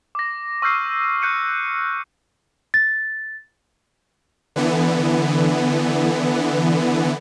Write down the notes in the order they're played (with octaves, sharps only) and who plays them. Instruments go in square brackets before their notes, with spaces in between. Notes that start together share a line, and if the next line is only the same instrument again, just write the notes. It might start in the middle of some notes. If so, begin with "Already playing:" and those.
[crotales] D6 A#6
C#6 E6 F6 G6 C7 D#7
F#6 G6 C#7 D#7
[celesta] A6
[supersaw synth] D3 E3 B3